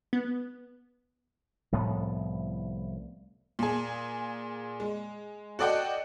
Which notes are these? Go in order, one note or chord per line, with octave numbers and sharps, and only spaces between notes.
B3
C2 A2 F3 B3
A#2 G#4
G#3
F#4 A4 D5 D#5 F#5 G5